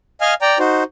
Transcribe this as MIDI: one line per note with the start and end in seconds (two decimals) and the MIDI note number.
0.21 0.34 75
0.21 0.34 77
0.21 0.34 80
0.21 0.34 89
0.42 0.58 74
0.42 0.58 79
0.42 0.58 82
0.59 0.84 63
0.59 0.84 66
0.59 0.84 72